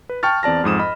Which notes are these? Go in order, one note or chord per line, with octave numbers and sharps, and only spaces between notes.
B4
G5 A5 C#6 F6 A6
E2 C4 D5 A5 A#6
F2 G#2 D#6 E7
D#5 B5